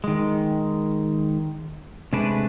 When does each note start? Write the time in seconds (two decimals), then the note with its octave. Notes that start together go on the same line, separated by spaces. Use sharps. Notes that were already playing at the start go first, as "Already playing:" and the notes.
0.04 D#3 G#3
2.13 C3 G#3 A3 D4 B4